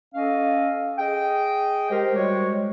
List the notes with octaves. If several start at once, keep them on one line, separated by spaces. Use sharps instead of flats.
C#4 A4 D#5 F5
G#4 D#5 G5
G#3 G4 A#4 C5
G3 G#3 F#4 C5 C#5